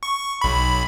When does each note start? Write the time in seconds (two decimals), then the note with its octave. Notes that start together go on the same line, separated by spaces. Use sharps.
0.03 C#6
0.41 B1 B5